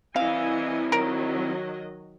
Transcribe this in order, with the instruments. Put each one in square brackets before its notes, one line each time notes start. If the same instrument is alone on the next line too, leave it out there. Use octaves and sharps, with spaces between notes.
[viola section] E3 D#5 G#5 [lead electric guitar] C4 E4 [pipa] F5
[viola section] D#3 F#3 D#5 [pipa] A#4